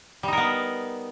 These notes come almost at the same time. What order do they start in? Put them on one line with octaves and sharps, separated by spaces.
G3 D#4 A#4 B3